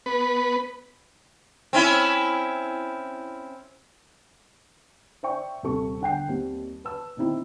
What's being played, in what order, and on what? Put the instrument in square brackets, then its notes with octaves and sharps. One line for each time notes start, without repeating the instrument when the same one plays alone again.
[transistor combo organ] B3 B4
[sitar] C4 C#4 E4
[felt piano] C5 D5 E5 G5 C#6
D#1 C3 A4 C#6
D3 F#5 G5 C7
D#2 G3 C4
B4 A5 E6
A#2 D#3 C4 E4